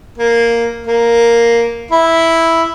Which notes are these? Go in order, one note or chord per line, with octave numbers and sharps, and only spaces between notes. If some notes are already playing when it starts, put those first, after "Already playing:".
A#3
A#3
E4